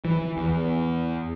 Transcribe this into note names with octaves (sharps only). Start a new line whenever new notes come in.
E3
E2